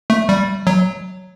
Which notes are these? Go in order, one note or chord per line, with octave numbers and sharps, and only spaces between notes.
A3
G3
F#3